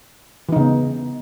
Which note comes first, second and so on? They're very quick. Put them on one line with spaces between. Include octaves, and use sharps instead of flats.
E3 D#4 C#3 B3